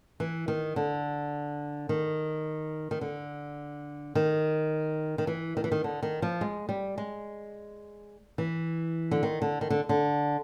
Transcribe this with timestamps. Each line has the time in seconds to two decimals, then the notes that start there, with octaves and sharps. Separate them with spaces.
0.20 E3
0.48 D#3
0.76 D3
1.89 D#3
2.91 D#3
3.01 D3
4.15 D#3
5.18 D#3
5.27 E3
5.57 D#3
5.64 E3
5.72 D#3
5.84 D3
6.03 D#3
6.22 F3
6.41 G#3
6.69 G3
6.98 G#3
8.38 E3
9.11 D3
9.23 D#3
9.42 D3
9.61 D#3
9.70 D3
9.89 D3